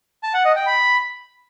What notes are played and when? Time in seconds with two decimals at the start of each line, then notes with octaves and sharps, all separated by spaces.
0.23 A5
0.34 F#5
0.45 D#5
0.56 G5
0.67 B5